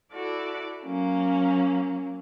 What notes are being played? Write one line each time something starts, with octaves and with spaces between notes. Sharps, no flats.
E4 F#4 A4 D5
F#3 A#3 C#4